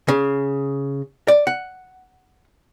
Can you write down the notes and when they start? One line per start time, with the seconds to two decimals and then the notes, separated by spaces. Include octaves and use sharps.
0.08 C#3
1.28 D5
1.47 F#5